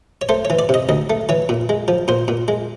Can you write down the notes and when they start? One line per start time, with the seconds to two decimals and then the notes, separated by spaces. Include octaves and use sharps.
0.22 C#5
0.29 A3 C5
0.45 C#5
0.50 E3
0.59 D5
0.69 C3 D#5
0.89 D2 D#5
1.10 A3
1.29 E3 C#5
1.49 A#2
1.69 G#3
1.88 F3
2.08 A#2 C5
2.28 A#2
2.48 G#3